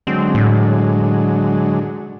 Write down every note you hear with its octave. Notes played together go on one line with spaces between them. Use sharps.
D3 F#3 G#3 C4
A2